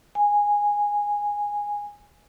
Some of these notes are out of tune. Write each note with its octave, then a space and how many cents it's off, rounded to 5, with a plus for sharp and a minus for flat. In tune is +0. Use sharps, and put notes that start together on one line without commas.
G#5 -10